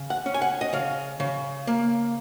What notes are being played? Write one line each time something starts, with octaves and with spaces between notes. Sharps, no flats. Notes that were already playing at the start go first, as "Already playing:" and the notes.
Already playing: C#3
F#5
C#4
G#5
F#5
D#5
C#3 F5
C#3
A#3